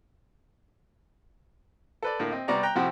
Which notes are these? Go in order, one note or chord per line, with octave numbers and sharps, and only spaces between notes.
A4 B4 D5
A2 D3 A#3
C4 D#5
C3 G3 B3 D5 A#5 C#6
G5 A#5 F#6
A2 C3 F3 C4 E4 F#4